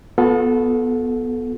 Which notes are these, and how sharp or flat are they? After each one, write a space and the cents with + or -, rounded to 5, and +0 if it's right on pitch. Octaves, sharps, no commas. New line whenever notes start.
B3 +0 F4 +45 A4 -15